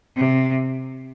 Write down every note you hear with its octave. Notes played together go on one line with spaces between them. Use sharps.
C3